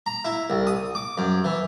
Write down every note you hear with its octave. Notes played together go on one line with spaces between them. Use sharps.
A#5
E4
C2
D#6
D6
F#2
E3